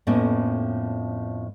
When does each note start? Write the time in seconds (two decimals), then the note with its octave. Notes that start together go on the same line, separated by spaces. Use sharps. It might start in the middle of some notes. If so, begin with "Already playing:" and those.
0.07 F2 A2 F3 A#3 B3 C#4